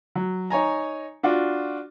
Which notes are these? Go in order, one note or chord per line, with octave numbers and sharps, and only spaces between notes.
F#3
D#4 C#5 G#5 A#5
D4 F4 F#4